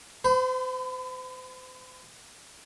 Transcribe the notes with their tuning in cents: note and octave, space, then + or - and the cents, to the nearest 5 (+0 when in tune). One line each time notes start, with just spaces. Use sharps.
C5 -35 B5 +40